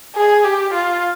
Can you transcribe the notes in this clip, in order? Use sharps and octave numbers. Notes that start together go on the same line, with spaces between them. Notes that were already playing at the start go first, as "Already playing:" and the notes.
G#4
G4
F4